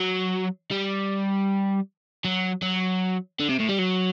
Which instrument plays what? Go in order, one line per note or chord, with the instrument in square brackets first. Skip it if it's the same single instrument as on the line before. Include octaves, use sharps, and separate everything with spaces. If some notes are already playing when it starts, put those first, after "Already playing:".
Already playing: [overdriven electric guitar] F#3
G3
F#3
F#3
D3
C3
A2
G3
F#3